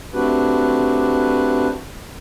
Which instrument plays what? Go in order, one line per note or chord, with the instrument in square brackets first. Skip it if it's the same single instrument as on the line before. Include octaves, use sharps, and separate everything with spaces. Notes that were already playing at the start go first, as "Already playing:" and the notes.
[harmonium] A3 C4 D4 F#4 G4 B4